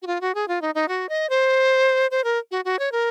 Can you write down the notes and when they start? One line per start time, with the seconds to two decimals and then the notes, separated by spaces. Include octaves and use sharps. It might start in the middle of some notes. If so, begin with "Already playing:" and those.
0.02 F#4
0.07 F4
0.21 F#4
0.35 G#4
0.48 F4
0.62 D#4
0.75 D#4
0.88 F#4
1.09 D#5
1.30 C5
2.11 C5
2.24 A#4
2.51 F#4
2.65 F#4
2.79 C#5
2.92 A#4